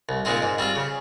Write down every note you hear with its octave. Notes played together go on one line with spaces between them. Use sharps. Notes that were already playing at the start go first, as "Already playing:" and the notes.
C2
A#2 G#3 C4 D#4
G#2
G3 C4 F4
C#3